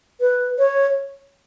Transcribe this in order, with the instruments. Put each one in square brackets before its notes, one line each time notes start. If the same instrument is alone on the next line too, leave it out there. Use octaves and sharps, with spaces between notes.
[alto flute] B4
C#5